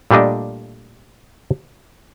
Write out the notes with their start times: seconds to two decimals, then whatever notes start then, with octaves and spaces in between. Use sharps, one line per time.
0.11 A#2 G3 A3 D4 D#5